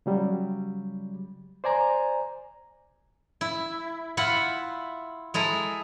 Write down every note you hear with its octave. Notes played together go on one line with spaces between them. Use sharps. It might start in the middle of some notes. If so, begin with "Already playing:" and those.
C#3 F#3 G3
C5 D5 G#5 A#5
E4
E4 F4 F#5 B5
G#3 E4 A4 A#5